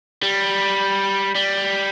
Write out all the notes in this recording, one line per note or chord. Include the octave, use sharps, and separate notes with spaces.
G3
G3